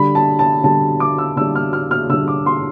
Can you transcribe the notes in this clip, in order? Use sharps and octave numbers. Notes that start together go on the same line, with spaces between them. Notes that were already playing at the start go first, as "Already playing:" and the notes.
Already playing: D3 G3 B5
A5
A5
D3 G3 A5
D6
E6
D3 G3 E6
F6
F6
F6
D3 G3 E6
D6
C6